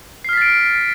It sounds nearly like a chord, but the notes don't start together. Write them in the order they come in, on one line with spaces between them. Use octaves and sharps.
C7 F6 B6 A6 D7